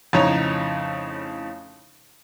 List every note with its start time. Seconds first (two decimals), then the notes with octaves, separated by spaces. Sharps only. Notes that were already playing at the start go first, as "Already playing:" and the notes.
0.13 F2 A2 C#3 D#4 C#5 A#5